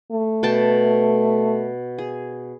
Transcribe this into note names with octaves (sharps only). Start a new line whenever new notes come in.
A3
B2 G5 A5
G#4